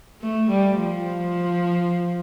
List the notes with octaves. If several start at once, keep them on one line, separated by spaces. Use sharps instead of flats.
A3
G3
F3